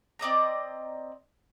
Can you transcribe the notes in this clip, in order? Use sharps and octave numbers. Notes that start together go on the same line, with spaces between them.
C4 D5 D#5 A#5